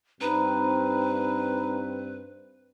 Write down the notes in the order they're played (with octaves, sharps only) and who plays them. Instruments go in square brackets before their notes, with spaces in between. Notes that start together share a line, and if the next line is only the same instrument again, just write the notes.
[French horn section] G2 C4 [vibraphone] D#4 A#5 B5 [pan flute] B4